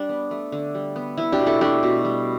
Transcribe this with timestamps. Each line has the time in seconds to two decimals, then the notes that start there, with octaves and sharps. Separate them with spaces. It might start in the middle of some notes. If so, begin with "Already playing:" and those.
Already playing: G3 D4
0.09 B3
0.31 A3
0.52 D3
0.75 G3
0.96 B3
1.17 B3 E4
1.32 D4 G4
1.40 B2
1.46 E4 A4
1.61 A3 D4 G4
1.83 B2
2.04 G3